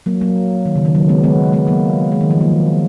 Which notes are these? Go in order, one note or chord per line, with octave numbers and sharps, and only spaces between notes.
F#3 A#3
F#3 A#3
D#3
C#3
D#3
F#3
G#3 B3
G#3 B3
G#3 B3
F#3 A#3
G#3
D#3
F3
F#3 A#3